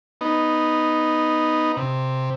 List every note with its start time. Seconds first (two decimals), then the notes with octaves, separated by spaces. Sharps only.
0.21 B3 D#4
1.77 C3